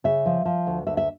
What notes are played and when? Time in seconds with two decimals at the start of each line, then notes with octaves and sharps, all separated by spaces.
0.04 C#3 E5
0.26 F3
0.45 F3
0.67 D2
0.87 D2 E5
0.97 E5